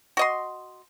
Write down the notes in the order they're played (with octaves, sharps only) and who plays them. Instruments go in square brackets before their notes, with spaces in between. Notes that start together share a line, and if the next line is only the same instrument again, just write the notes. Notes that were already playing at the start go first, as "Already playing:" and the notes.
[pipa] F#4 D#5 C6